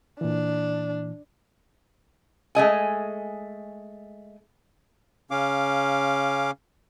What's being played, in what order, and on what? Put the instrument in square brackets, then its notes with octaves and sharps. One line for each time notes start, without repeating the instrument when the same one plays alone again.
[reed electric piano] A#2 E3 [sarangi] D4
[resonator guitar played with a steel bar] G#3 A3 D#5 G#5
[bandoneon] C#3 C#4 F5 D6